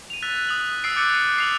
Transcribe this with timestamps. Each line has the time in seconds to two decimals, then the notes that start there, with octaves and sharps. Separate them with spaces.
0.10 D#7 F7
0.22 E6 F#6 A6 B6
0.49 D#6 F#7
0.84 E6 F#6 A6 C7 D7
0.96 D6 F#6 G6 A6 C#7 D#7
1.38 C7 F7 F#7